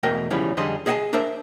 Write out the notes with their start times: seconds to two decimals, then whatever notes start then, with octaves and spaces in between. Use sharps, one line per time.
0.03 E2 B2 A3 A#4 D#5 G5
0.30 B1 E2 C#3 F3 G3 E4
0.57 F2 D3 G3 G#4 D#5 C6
0.86 G#4 D#5 E5 F#5 G#5 A5
1.13 D4 A#4 C5 E5